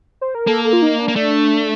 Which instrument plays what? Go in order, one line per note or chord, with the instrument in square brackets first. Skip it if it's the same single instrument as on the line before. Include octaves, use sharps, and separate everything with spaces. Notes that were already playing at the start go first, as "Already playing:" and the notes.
[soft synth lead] C5
A#4
[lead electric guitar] A#3 [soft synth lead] A4
[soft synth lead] A4
F4
D#4
D4
[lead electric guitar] A#3
[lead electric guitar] A3 [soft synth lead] D4